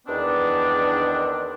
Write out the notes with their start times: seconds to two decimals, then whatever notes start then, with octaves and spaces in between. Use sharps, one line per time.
0.07 E2 D#3 B3 C4 D4